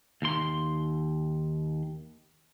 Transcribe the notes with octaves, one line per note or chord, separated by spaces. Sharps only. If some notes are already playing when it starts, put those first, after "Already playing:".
D#2 C6